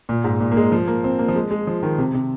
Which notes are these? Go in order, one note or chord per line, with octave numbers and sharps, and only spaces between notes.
A#2
G#2
A#2
A#3
G#3
F3
A#3
C4
A#3
F3
G#3
G#3
F3
D#3
C3
C3